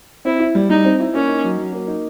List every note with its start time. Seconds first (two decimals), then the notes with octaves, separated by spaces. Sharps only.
0.25 C4 E4
0.40 E4
0.55 G3
0.69 G3 D#4
0.84 C4
1.00 E4
1.14 A#3 C#4
1.29 D#4
1.44 F#3
1.58 F#3
1.72 A#3
1.88 D#4